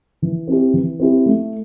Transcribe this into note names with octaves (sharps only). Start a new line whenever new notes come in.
E3
C4 E4 G4
E3
C4 E4 G4
A3